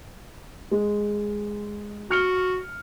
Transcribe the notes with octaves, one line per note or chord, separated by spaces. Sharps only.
G#3
F#4 F6 C#7 G7